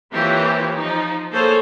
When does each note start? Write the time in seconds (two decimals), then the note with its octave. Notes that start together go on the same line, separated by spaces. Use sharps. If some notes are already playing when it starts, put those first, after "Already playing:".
0.12 E3 A#3 C4 F4 G4 C#5
0.74 F3 D#4
1.31 A#3 G#4 A4 C5 C#5